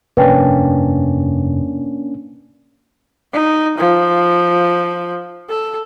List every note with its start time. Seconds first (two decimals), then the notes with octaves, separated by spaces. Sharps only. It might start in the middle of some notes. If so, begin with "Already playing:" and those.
0.17 F1 G2 A#3 C#4 D4 B4 G5
3.33 D#4
3.78 F3
5.49 A4